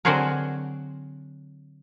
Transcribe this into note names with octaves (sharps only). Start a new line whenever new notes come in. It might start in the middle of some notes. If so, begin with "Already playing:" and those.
D3 F#3 C4 F#4 G#4 A#4